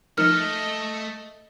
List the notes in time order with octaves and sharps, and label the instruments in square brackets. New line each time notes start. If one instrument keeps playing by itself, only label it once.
[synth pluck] F3 D#4 A#4 [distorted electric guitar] A3 A4 [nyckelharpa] D#5 [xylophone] F6